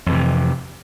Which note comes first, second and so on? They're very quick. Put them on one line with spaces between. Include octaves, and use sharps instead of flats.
F2 E3 C3